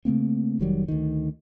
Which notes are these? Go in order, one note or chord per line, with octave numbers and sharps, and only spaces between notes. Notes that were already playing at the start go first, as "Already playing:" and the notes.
C#3 A3 A#3 C4
F1 D#3 F#3 G3
D2 D#3